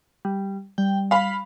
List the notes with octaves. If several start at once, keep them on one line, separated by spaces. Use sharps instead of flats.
G3
G3 G5
F5 B5 B6